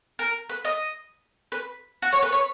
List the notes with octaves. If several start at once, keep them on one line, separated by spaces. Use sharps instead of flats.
A#4
B4
D#5
B4
F#4
C#5
B4
C#5